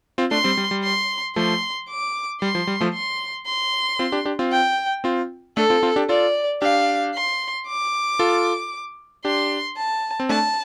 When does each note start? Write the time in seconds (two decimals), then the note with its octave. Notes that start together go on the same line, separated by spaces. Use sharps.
0.18 C4 F4
0.31 A3 D4 C6
0.44 G3 C4
0.57 G3
0.71 G3
0.84 C6
1.36 F3 A3 C6
1.89 D6
2.41 G3 C6
2.55 F3
2.67 G3
2.81 F3 A3
2.94 C6
3.47 C6
3.99 C4 F4
4.12 D4 G4
4.25 D4 G4
4.39 C4 F4
4.52 G5
5.04 C4 F4
5.57 A3 D4 A4
5.70 C4 F4
5.83 C4 F4
5.96 D4 G4
6.09 F4 A4 D5
6.62 D4 G4 F5
7.14 C6
7.67 D6
8.19 F4 A4
9.25 D4 G4 C6
9.77 A5
10.20 C4
10.29 A3 D4 A5